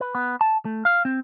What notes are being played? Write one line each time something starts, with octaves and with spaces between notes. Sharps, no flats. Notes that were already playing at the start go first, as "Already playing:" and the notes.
B4
B3
A5
A3
F5
C4